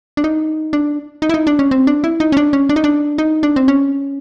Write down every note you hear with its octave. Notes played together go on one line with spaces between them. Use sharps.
D4
D#4
D4
D#4
E4
D#4
D4
C#4
C4
D4
E4
D#4
C#4
D4
C#4
D4
D#4
D4
D#4
D4
C4
C#4